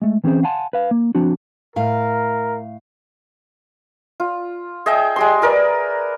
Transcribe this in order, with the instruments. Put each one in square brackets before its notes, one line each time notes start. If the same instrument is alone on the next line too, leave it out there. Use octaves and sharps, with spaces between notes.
[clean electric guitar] G#3 A3
E3 C4 C#4 G#4 C5
F5 F#5 G#5 A5 C6
B4 F5
A#3
F3 C4 D4 F#4
[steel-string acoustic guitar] A2 F5 [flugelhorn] A#4
[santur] F4
G#4 D#5 E5 G5
G#3 G4 C6
G#4 A#4 B4 D5